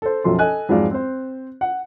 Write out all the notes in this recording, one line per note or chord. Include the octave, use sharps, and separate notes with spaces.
A4 C5
B1 F#2 F3 A4 C6
A4 D#5 G#5 F#6
F2 G#2 F#3 G#3 D5 F5
C4 C5
F#5